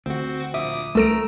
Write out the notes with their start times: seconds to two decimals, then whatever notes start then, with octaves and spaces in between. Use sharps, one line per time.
0.06 D2 C4 F#4
0.54 A#1 E5 D6 D#6
0.95 C2 A3 A4 A#5 E6 D7